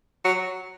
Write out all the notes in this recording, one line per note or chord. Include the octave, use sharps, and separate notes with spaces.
F#3